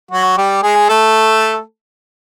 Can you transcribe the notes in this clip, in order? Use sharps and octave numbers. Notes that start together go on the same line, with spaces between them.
F#3 F#4
G3 G4
G#3 G#4
A3 A4